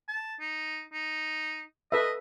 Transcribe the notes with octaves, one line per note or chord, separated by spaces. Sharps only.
A5
D#4
D#4
A4 B4 D#5 E5